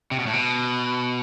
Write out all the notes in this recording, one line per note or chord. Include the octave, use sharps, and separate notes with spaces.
C3
B2
A2
B2